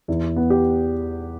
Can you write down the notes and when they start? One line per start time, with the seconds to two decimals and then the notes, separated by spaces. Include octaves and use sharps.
0.08 E2 E4
0.36 B3
0.50 G4